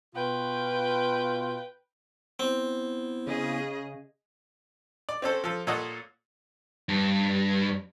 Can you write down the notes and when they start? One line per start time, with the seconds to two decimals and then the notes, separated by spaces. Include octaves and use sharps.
0.15 B2 F4 B4 G5
2.40 B3 C4 E4
3.27 C#3 G#4 D#5
5.09 D5
5.22 C4 C#4 A4 C5
5.44 F3 A4
5.67 A#2 A4 C#5 D#5 F#5
6.89 G2